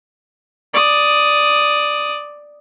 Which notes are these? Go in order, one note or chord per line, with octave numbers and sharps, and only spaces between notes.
D5 D#6